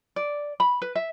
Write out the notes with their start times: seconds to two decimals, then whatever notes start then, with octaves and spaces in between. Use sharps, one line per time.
0.16 D5
0.60 B5
0.82 B4
0.95 E5